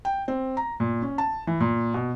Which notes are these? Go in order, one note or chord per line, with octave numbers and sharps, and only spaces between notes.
G5
C4
A#5
A#2
C#4
A5
E3
A#2
B2